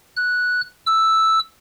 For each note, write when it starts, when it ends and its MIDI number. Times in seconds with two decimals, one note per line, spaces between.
0.17 0.61 90
0.86 1.39 88